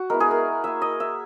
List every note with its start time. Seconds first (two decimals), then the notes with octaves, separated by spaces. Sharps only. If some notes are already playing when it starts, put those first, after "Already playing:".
Already playing: F#4
0.10 G#3 B3 E4 A#4
0.20 G#4
0.31 A#4
0.64 A#3 E4 E5
0.82 D#5
1.00 E5